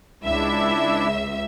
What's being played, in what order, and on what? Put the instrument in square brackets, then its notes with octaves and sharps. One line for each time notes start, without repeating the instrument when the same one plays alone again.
[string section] C#2 E5 [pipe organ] D4 E4